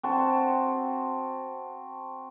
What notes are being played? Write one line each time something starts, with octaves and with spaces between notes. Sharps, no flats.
C4 F#4 C5 A5